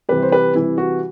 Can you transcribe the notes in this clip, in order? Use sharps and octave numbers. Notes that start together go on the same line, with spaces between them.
C3 E3 G3 G4 B4
C5
G4 B4
C3 E3 G3 E4
F#4